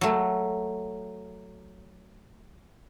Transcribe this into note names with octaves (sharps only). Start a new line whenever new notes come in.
F#3 A3